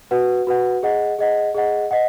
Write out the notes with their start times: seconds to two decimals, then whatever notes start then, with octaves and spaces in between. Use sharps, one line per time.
0.11 F#4 B4 F#5
0.47 F#4 B4 F#5
0.83 G#4 D#5 F#5
1.19 G#4 D#5 F#5
1.54 G#4 D#5 F#5
1.91 D#5 F#5